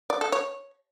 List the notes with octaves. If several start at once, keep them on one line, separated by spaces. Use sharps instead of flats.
D5
A4
C#5